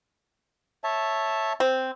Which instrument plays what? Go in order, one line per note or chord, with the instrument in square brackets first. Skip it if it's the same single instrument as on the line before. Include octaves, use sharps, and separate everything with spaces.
[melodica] C#5 E5 A5
[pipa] C4